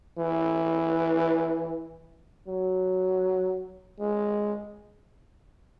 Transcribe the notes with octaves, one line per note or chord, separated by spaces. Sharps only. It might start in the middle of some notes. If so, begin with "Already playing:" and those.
E3
F#3
G#3